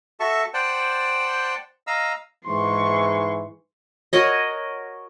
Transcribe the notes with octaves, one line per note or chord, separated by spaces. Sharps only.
F#4 A4 E5 A5 C#6
C5 D5 F#5 G5 A5
D#5 F5 A#5 E6
G#2 E3 C6 C#6
F#4 A#4 C#5 D#5